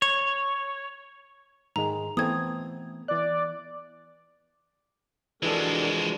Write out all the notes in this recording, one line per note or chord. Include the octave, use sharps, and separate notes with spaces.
C#5
G#2 D#3 G#3 A#5
E3 A3 B3 C4 D#6 G#6
E3 D5 F#6
E3 F3 G#3 D4 F#4 A4 A#4